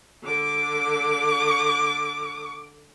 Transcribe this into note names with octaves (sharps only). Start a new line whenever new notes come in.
D3 D6